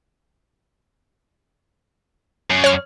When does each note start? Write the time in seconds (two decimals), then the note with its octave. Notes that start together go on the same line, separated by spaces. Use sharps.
2.50 F#2
2.64 C#5 F6